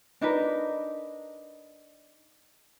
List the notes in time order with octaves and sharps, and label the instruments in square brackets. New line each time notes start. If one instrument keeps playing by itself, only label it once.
[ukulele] D4 D#4 A#4 B4